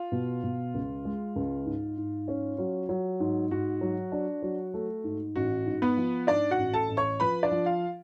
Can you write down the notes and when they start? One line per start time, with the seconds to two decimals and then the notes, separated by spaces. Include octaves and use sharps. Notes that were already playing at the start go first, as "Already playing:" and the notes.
Already playing: F4
0.12 B2
0.43 B2
0.74 C#2
1.05 G#3
1.36 C#2
1.65 G#2
1.97 G#2
2.28 C#4
2.58 F#3
2.89 F#3
3.20 G#2
3.51 G#2 F#4
3.81 F#3
4.12 D4
4.42 F#3
4.74 A3
5.04 G#2
5.36 A1 F#4
5.66 G#2
5.82 B3 B4
5.97 F3
6.27 G#2 D4 D5
6.51 F#4 F#5
6.58 A1
6.74 A4 A5
6.89 A1
6.97 C#5 C#6
7.20 F3 B4 B5
7.43 D4 D5
7.51 F3
7.66 F4 F5